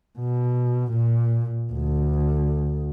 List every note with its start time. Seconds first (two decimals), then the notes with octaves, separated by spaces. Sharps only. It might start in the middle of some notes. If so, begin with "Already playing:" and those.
0.19 B2
0.91 A#2
1.73 D2